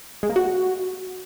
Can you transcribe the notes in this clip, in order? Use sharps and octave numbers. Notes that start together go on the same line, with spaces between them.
G#3
A#3
F#4